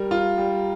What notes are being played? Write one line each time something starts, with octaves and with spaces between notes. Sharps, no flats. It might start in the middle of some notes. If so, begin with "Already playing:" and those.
Already playing: G3 A#4
F4
G3